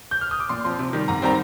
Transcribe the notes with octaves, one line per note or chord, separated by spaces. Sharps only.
G6
F6
D#6
D6
A#2 C6
F3 C4 C6
C3
D#3 G3
G#2 A#5
D#3 G3 C4 A#5